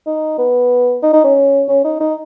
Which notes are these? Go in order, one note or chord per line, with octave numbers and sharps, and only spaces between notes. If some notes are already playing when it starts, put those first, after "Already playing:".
D#4
B3
D#4
D#4
C#4
C#4
D#4
D#4